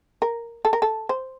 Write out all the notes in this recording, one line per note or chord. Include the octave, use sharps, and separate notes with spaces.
A#4
A4
A#4
A4
C5